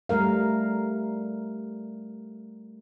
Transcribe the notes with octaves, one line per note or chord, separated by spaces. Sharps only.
G3 A3 A#4 F5